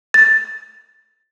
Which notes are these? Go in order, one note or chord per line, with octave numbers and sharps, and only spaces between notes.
A6